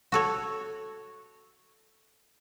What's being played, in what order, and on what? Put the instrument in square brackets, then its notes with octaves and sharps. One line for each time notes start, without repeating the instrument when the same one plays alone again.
[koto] F#4 A4 C#5